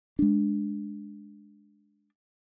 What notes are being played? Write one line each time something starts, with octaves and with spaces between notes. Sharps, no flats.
G#3 D4